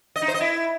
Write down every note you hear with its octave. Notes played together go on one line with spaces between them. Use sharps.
D#5
D#4
C5
D#5
E4